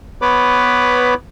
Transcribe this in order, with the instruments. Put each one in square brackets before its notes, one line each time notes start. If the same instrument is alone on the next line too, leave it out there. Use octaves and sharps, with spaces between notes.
[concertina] B3 B4 C#5 B5 D6